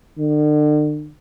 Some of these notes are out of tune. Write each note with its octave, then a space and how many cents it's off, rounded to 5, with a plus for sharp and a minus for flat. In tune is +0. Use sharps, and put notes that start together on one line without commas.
D3 +40